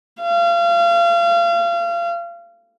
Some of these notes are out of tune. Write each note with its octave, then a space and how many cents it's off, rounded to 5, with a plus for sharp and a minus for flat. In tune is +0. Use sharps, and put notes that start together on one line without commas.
F5 -30